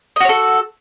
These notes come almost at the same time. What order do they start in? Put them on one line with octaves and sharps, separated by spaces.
D#5 F#4 C#5 A4